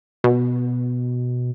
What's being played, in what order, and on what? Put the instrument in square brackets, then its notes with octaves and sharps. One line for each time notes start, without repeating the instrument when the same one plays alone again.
[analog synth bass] B2